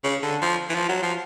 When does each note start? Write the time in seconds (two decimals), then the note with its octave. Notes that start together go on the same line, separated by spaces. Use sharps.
0.04 C#3
0.23 D3
0.42 F3
0.69 E3
0.74 F3
0.89 F#3
1.03 F3